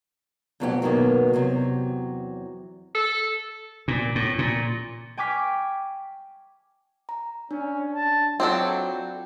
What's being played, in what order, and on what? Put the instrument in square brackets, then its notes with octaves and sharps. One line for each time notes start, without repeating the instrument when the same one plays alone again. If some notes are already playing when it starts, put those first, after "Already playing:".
[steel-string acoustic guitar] F2 B2 F#3 A3 F4 G4
B2 D#3 E3 F#3 A#3
E2 C3 F#3
[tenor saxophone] A4
[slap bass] A#2
A2
A#2
[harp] G5 G#5 C#6 D6 F6 B6
[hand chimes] A#5
[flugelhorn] C#4 [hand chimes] D4
[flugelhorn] A5
[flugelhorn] F#3 [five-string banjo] C4 D4 A4 [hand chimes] F4